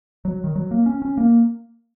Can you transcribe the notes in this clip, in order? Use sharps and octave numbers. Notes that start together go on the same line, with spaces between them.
F#3
D#3
F#3
A#3
C#4
C#4
A#3